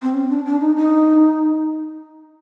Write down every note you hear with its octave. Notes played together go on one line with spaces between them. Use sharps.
C4
C#4
D4
D4
D#4
D#4